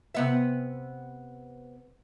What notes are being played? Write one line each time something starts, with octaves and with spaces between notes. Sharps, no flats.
C3 B3 E5